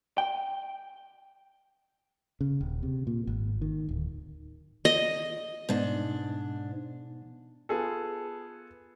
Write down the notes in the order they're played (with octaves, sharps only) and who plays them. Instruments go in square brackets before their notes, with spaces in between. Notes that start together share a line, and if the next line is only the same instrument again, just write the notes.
[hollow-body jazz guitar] G5
[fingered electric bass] C#3
D#1
C3
A#2
G#1
D#3
D1
[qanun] D#5
[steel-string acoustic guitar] G#2 D4 [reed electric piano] B2 B3 D#4
[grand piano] B3 F4 G#4 A4